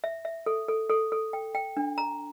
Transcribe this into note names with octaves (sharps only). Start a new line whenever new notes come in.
E5
E5
A4
A4
A4
A4
G5
G5
D4
A#5